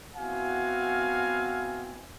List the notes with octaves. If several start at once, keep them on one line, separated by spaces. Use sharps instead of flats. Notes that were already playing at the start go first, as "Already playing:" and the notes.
B3 C4 E4 F#4 F5 G#5